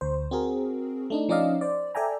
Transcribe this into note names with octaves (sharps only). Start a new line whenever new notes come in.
D2 C5
C4 F#4 G#4 A#4
A3 D4 D#4
F3 C#4 D#4 D5 D#5 F5
C5 D5
A4 D5 E5 G5 G#5 A#5